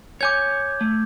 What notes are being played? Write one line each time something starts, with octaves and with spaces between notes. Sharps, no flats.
C#5 G#5 D6 G6 G#6
A3